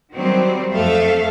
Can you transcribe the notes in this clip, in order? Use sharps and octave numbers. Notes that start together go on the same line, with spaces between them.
D#3 F#3 G3 C4
F2 A3 A4 E5 F5